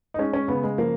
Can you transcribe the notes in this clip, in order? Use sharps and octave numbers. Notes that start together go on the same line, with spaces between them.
D#4
G#3 C#4
C#4
C#3 B3
G#3
F3 A#3